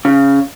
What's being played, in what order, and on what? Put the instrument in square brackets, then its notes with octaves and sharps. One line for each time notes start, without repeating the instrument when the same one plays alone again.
[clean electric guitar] C#3